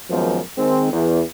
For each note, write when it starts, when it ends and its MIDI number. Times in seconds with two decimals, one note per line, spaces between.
0.10 0.38 42
0.10 0.38 51
0.10 0.38 53
0.10 0.38 56
0.10 0.38 58
0.10 0.38 59
0.57 0.88 51
0.57 0.88 56
0.57 0.88 60
0.91 1.21 40